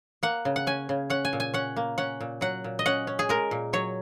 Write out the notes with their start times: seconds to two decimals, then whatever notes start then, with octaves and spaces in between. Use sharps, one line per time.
0.23 A#3 F#5
0.45 C#3
0.56 F#5
0.67 C#4 G#5
0.89 C#3
1.10 C#4 F#5
1.25 G#5
1.33 A#2
1.40 G#5
1.54 C#4 F#5
1.76 A#3
1.98 C#4 F#5
2.20 A#2
2.41 F#3 F#5
2.64 A#2
2.79 D#5
2.86 C#4 F#5
3.07 C#4
3.19 G#4
3.29 G#3 A#4
3.51 A#2
3.73 F#3 C#5